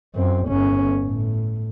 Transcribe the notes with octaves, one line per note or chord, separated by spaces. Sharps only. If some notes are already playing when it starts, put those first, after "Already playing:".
F#2 C4
G1 C#4
A2